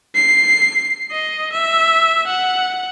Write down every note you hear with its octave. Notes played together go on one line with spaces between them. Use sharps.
C7
D#5
E5
F#5